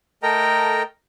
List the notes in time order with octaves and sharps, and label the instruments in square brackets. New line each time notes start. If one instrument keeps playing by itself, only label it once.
[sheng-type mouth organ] A3 A4 A#4 D#5 G5 A#5